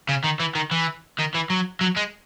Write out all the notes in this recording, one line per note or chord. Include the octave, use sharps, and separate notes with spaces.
C#3
D#3
E3
D#3
E3
D#3
E3
F#3
F#3
G#3